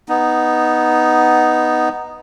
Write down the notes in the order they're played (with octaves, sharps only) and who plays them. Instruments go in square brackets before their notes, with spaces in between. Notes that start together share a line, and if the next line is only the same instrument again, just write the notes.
[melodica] B3 D#4